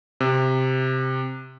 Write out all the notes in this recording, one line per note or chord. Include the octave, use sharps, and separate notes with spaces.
C3